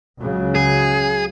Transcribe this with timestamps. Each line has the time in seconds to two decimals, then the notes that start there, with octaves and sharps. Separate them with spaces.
0.20 C#2 C#3 F#3
0.55 G#4